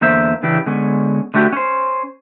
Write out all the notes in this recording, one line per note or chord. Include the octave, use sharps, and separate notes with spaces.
E2 D3 A#3 C5 E5
C#3 E3 D4 E4 G4
D3 G#3 B3 C#4
D3 A3 F#4 G4
C#4 C5